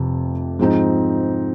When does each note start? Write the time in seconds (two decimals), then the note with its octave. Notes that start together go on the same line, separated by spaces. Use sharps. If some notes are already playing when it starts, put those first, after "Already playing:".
Already playing: F1 F2 C3
0.59 G#2 F3 C4 D#4